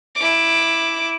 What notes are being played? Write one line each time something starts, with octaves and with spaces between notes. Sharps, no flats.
E4 D6